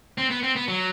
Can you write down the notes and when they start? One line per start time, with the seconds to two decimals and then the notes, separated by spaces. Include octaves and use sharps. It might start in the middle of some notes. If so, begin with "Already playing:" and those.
0.18 C4
0.30 B3
0.43 C4
0.56 B3
0.68 F#3